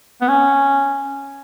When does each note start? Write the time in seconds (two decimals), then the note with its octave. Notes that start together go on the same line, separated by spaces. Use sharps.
0.22 B3
0.28 C#4